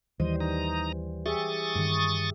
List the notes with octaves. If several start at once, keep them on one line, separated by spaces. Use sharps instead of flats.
D#2 E3 G3 C5 D#5
D#4 A#5
G4 G#4 E5 C#6 D#6 A6
G2 D#3